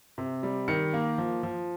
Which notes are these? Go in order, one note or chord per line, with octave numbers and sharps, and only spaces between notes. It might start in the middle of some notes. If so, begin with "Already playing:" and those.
C3
G3
D#3 C#7
A#3
F3
F3